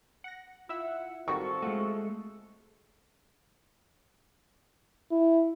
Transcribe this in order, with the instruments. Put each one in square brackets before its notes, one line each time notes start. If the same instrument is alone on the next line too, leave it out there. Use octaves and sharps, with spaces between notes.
[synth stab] F#5 A#6
[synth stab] E4 E5 E6 [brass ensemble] F4 F#5
[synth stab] D#3 G3 F#4 [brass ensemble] C4 F4 A4 [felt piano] C#6
[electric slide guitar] G#3 A3 [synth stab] F#4
[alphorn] E4